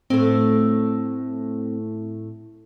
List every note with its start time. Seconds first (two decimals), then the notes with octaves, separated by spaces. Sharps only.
0.10 A2 A3 C4